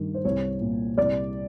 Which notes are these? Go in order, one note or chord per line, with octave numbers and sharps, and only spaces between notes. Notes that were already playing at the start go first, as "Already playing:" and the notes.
Already playing: G2 D#3
C5
C2 C#5
A#2
C2 D5